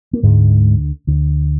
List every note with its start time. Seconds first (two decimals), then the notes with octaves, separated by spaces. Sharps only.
0.13 A#3
0.23 D2 G#2 D3 G#3
1.07 D2 D3